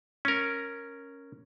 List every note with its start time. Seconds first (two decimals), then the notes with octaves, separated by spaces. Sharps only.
0.25 C#4 A#4